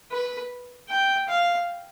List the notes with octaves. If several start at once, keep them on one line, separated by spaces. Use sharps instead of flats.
B4
G5
F5